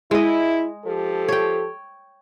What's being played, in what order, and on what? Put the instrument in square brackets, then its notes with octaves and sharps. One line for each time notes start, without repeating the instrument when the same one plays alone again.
[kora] G#3 D#5 [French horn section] E4
[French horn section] F3 G4 A4
[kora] C#5 G5